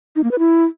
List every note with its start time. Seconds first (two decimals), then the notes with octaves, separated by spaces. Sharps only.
0.16 D#4
0.24 A#3
0.31 B4
0.39 E4